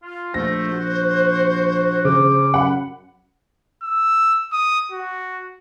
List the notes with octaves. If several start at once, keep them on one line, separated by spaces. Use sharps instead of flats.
F4
A#1 A3 C5 A#6
F#4
C#3 D6
F#2 F#5 B5
E6
D#6
F#4